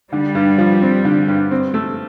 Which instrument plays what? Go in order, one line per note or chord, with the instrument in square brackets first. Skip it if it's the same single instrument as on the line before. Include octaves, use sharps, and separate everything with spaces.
[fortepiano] D3 [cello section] G3
[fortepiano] G2
F3
C4
D3
G2
C4
A3